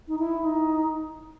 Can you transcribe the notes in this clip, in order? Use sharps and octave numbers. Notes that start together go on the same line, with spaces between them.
D#4
E4
D#4